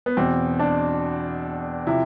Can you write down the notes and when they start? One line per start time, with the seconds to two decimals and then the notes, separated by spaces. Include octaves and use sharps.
0.06 B3
0.17 E2 B2 C4
0.59 D4
1.86 C3 F3 E4